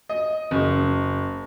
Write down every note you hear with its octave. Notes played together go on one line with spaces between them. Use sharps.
D#5
F#1